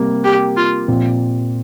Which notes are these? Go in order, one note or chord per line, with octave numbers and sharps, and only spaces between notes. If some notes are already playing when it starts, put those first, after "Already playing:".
Already playing: C3 G3 A#3
G4
F4
A#2 F3 C4